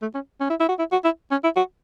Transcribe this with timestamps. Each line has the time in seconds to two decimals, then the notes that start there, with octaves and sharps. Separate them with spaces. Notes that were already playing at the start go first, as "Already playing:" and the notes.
0.02 A3
0.14 C#4
0.40 C#4
0.50 E4
0.60 E4
0.69 F#4
0.79 E4
0.92 F#4
1.04 E4
1.31 C#4
1.44 E4
1.56 F#4